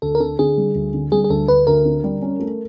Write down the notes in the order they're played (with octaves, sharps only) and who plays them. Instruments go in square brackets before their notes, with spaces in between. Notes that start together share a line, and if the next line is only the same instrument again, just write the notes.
[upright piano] D2 [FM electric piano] A4
[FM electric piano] A#4
[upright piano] D3 [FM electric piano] A4
[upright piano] D3 [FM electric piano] G#4
[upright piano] G3
D2
D3
[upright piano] G3 [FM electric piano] G#4
[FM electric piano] G#4
[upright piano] D2 [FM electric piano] A4
[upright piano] D2 [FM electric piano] B4
[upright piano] D2 [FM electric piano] A#4
[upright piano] D3
G3
C#4
A3